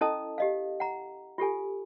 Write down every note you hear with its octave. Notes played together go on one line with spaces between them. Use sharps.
C#4 E4 A4 D#5 A5 D#6
G4 D#5 F5
F#5 A#5
F4 G4 A4 G#5